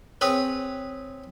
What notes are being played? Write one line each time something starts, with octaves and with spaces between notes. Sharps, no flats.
C4 G#4 B4 C#5